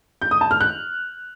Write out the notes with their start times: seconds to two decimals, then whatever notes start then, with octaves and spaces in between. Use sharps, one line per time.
0.21 G6
0.31 D#6
0.41 A5
0.51 F6
0.61 F#6